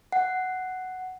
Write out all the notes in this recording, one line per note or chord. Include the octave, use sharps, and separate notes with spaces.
F#5